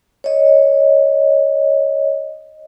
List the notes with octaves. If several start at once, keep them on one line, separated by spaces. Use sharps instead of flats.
C#5 D#5